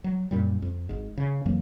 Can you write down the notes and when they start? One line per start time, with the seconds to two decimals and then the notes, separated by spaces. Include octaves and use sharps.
0.04 F#3
0.31 F#2 A#2 G3
0.62 F2
0.89 G#1 G#2
1.17 C#3
1.45 F2 E3 F#3 A#3